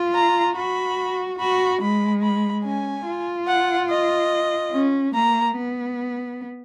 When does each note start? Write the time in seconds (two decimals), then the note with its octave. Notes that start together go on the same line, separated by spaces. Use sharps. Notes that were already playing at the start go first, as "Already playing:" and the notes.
Already playing: F4
0.15 A#5
0.56 F#4 B5
1.39 F#4 B5
1.81 G#3 B5
2.23 B5
2.64 C#4 G#5
3.06 F4
3.48 F#5
3.90 D#5
4.72 C#4
5.15 A#3 A#5
5.57 B3